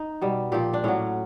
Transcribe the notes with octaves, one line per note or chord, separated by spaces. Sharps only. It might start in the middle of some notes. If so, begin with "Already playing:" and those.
Already playing: D#4
B2 G3
A#2 F3 G4
D4
A2 F#3 C#4